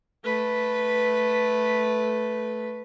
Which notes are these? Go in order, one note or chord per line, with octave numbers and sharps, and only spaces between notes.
A3 B4